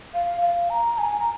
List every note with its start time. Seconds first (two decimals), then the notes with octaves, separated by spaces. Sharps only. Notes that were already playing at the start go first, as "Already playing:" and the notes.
0.14 F5
0.42 F5
0.70 A#5
0.98 G#5
1.19 A#5